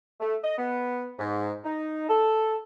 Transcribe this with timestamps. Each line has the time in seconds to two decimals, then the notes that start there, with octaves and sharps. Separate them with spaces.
0.20 A3
0.44 D#5
0.58 B3
1.19 G#2
1.64 D#4
2.09 A4